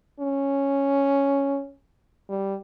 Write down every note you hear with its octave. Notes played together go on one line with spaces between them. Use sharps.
C#4
G3